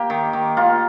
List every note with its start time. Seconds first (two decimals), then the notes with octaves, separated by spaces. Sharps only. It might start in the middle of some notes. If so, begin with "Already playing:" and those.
Already playing: A#3 G4
0.10 D#3
0.33 D#3
0.57 A#3 F4